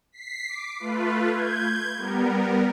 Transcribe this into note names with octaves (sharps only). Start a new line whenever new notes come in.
B6 C7
D6
A3 F4 B4
G6 G#6
G3 B3 A#4